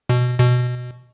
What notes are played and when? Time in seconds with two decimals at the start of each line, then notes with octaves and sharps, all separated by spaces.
0.09 B2
0.39 B2